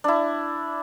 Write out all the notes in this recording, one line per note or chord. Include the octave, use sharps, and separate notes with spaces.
D4 E4